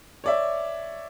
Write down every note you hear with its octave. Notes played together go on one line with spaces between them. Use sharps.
C#5 D5 E5